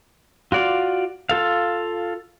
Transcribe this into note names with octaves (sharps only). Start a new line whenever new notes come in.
F4 F#4 D5 F5
F4 A4 F5